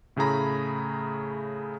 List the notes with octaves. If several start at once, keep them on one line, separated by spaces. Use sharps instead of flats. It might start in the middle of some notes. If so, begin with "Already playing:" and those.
A2 C#3 A3 G#4 A#5 B5